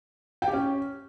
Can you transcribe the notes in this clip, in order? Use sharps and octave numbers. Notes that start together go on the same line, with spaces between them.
G5
G4
C#4